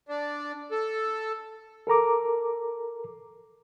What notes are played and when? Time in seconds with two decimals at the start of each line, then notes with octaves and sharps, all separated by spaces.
0.09 D4
0.72 A4
1.87 A4 A#4 A#5 D6